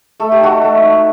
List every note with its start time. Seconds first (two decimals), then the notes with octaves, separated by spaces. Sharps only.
0.20 A3 A4
0.32 G4
0.41 D#4 F#4 A4
0.62 A3
0.82 D#4